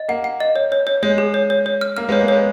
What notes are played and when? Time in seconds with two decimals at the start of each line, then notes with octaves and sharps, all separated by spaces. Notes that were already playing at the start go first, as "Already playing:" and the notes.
Already playing: D#5
0.08 A#3 F#5
0.24 F#5
0.40 D#5
0.56 C#5
0.72 C#5
0.87 C#5
1.03 G#3 C#5
1.18 G#4
1.34 C#5
1.50 C#5
1.66 C#5
1.81 F6
1.97 A#3 F6
2.09 G#3 B3 C#5
2.21 A#3
2.28 G#3 B3 C#5